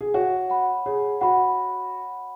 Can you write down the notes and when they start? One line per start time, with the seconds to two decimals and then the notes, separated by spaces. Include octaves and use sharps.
0.01 G#4
0.14 F#4 C#5
0.50 F#5 B5
0.86 G#4 C#5
1.21 F#4 F#5 B5